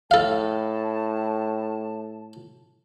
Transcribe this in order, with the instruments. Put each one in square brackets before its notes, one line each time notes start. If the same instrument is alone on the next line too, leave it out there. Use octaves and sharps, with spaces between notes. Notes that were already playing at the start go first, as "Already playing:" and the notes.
[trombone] A2 [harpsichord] A4 F5 [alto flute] A5